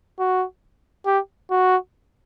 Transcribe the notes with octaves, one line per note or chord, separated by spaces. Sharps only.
F#4
G4
F#4